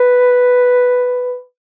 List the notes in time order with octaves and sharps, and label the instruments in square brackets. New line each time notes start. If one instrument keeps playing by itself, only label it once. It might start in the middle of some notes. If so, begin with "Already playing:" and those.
Already playing: [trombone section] B4